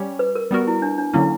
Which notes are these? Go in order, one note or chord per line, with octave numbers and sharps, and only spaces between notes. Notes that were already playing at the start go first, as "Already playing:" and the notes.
Already playing: G3 C#4 G4 C#5
B4
A#4
G3 B3 F#4 A#4
E4
D4
D4
D3 F#3 A#3 C#4 E4